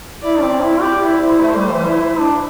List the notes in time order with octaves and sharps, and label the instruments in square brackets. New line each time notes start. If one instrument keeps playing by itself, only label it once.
[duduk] E4 [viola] D5
[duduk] C4
E4
[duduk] G4 [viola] D5
[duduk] E4
[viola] C5
[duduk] E4
A3
G3
E3
E4
E4
D4